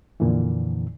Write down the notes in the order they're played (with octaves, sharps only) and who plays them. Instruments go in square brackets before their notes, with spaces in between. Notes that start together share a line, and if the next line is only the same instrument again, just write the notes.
[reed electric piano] F2 A#2 D3 E3